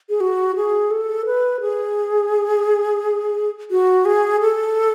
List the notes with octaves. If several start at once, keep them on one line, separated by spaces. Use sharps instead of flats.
G#4
F#4
G#4
A4
B4
G#4
F#4
G#4
A4